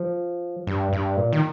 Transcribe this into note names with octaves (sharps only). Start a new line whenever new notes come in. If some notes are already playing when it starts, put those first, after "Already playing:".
Already playing: F3
G2
G2
A#2
D#3